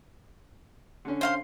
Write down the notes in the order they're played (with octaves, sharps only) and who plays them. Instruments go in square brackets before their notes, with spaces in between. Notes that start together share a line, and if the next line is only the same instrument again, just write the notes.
[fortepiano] D3 C#4
[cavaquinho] C5 F5 C6